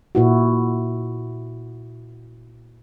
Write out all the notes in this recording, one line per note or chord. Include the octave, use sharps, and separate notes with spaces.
A#2 E4 F#4